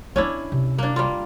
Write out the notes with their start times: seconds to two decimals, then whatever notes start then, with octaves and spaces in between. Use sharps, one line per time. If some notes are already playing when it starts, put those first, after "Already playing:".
0.16 A#3 B3 C#4 D4 E4
0.52 C3
0.78 A#3 D4
0.96 G3 A#3 F4